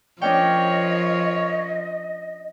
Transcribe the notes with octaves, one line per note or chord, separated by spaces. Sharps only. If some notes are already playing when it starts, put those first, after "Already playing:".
F3 C#4 D4 A#4 C#5 D#5 G5